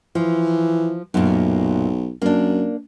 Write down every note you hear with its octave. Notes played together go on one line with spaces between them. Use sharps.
E3 F3
B1 F#2 A#2
F#2 A#3 D4